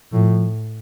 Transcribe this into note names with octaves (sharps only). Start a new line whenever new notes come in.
A2 F3